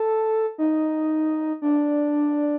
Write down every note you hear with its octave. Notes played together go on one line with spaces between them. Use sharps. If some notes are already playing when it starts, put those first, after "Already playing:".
Already playing: A4
D#4
D4